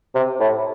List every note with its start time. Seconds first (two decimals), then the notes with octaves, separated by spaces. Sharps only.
0.15 C3
0.40 A2